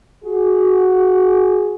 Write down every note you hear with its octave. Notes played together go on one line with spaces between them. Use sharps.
F#4 G#4